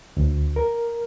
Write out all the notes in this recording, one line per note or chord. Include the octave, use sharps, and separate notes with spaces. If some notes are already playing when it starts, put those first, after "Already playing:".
D2
A#4